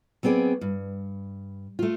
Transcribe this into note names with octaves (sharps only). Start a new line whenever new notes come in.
F#3 B3 C4 G#4 D5
G2
A3 F4